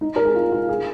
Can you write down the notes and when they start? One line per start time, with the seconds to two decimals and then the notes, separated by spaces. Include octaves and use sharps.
0.01 D#4
0.16 A#4
0.25 G#4
0.35 F4
0.52 F4
0.69 G#4